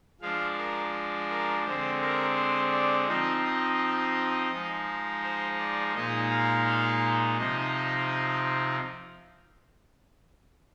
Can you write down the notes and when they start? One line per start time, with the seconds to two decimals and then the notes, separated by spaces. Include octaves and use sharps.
0.21 F3 G#3 D4 F5
0.57 A#4
1.29 A#4
1.65 D3 G#3 C4 C5
2.01 A#4
2.36 C5
2.71 D5
3.07 F3 C4 D#4 D#5
3.44 D#5
4.52 F3 G#3 D#4
5.22 C5
5.59 D5
5.94 A#2 G#3 D#4 D#5
6.30 F5
7.38 C3 F3 C4 D#4 D#5